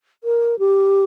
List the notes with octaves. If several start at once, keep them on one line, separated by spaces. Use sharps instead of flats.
A#4
G4